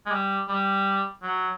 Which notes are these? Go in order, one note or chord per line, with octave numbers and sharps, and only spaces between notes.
G#3
G3
G3
F#3